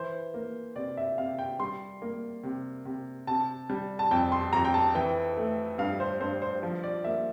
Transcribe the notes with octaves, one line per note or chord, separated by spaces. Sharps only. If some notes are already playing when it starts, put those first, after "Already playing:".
Already playing: E3 C5
A#3
C3 D5
E5
C3 F5
G5
G3 C6
A#3
C3
C3
C3 A5
G3
A5
F2 G5
C6
F2 A#5
G5
A5
E3 G5
A3
G2 F5
C5
G2 C5
C5
F3
D5
A#3 E5